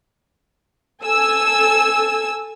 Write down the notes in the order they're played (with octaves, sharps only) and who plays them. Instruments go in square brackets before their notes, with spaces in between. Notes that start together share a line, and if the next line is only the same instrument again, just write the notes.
[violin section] A4 G#5 E6